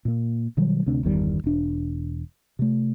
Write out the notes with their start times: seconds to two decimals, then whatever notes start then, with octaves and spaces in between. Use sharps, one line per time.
0.05 A#2 A#3
0.57 B2 D#3 F#3 G3
0.86 D2 C3 C4 D4
1.03 G1 E2 D#3 G3
1.44 E1 D4
2.59 C3 A3